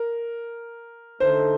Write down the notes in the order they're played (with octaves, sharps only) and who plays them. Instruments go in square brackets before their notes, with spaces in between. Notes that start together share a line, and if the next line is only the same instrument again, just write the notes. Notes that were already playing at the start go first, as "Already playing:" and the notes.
Already playing: [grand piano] A#4
[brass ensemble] D3 A3 D#4 A4 [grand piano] C5